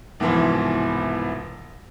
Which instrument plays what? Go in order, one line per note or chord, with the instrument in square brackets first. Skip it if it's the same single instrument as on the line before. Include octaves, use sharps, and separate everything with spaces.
[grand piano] C2 G#2 B2 E3 F3